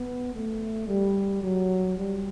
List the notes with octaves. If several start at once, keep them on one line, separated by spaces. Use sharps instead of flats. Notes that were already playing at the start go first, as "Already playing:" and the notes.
Already playing: B3
A3
G3
F#3
G3